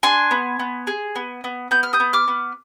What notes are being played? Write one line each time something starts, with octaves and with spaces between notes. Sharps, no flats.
D4 G#5 C6
B3
B3
G#4
B3
B3
B3 G6
F6
D#6 G6
B3
D6 F6
B3